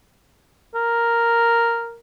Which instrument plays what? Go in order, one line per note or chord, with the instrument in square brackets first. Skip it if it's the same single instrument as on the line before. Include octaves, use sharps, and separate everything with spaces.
[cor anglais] A#4